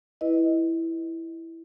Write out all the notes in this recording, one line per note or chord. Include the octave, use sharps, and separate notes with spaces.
E4 B4 D#5